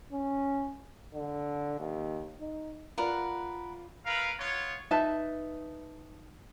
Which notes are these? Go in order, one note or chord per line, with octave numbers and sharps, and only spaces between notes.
C#4
D3
D#2
D#4
F4 A#4 B4 D5 F#5
E4 A#4 B4 F5
B3 F4 C#5
D#4 B4 E5 A5